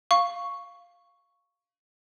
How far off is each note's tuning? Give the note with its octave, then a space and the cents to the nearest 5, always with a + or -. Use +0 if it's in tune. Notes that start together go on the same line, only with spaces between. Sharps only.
F5 +0 C#6 +0